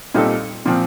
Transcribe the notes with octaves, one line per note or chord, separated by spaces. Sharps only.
A#2 G3 C4 D#4 A4
A#2 F3 C4